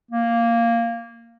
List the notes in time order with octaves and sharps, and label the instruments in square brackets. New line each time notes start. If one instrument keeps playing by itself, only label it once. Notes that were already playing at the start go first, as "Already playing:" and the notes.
[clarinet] A#3